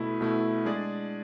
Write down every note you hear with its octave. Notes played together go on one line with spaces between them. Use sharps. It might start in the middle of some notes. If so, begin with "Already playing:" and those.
Already playing: B2 A3 E4
B2 A3 E4
G#3 D4 G#4 D5